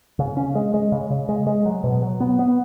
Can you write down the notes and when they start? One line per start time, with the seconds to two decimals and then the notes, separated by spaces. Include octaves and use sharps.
0.19 C#3
0.37 C#4
0.55 G#3
0.74 G#3
0.92 C#3
1.10 C#3
1.29 G#3
1.47 G#3
1.65 F#3
1.84 B2
2.02 F#3
2.20 B3
2.39 B3